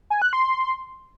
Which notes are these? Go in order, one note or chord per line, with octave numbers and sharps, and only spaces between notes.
G#5
F#6
C6